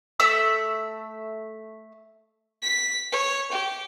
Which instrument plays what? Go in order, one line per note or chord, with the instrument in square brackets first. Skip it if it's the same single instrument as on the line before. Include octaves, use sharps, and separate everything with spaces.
[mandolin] A3 E5 E6
[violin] B6
C#5
G4